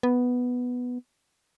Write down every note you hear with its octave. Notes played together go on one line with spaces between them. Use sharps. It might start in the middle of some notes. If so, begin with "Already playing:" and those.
B3